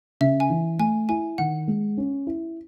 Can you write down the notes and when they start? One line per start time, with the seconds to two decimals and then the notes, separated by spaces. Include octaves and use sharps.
0.21 C#3 E5
0.40 G#5
0.50 E3
0.79 A3 G#5
1.09 E4 G#5
1.38 D#3 F#5
1.68 G#3
1.97 C#4
2.27 E4